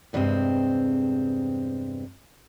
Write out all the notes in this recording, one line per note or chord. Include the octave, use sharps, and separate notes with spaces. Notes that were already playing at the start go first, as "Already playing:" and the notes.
E2 G2 C3 G#3 C4